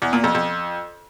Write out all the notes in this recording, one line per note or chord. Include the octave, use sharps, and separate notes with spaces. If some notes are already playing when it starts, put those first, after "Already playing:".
E2
A#2
F2
F2